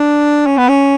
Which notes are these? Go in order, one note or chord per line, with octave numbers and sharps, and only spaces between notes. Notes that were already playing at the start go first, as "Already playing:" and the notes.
Already playing: D4
C#4
B3
C#4